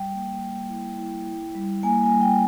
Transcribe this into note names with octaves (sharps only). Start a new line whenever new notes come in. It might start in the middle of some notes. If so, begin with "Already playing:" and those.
Already playing: G3 G5
A#3
A#3
E4
E4
E4
G3
A#3 G#5
G#5
G3
G5